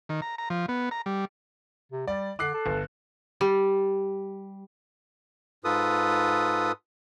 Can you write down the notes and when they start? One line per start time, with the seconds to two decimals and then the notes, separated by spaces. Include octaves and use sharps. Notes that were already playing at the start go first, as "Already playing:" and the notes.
0.09 D#3
0.22 A#5
0.38 A#5
0.50 F3
0.69 B3
0.91 A#5
1.06 G3
1.92 C3
2.07 G3 D5
2.39 D3 D6 F#6 C7
2.54 A4
2.66 G1
3.41 G3
5.64 G#2 F4 A4 B4 D#6